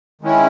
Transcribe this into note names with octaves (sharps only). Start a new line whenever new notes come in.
D#3 G#3 C#4 E4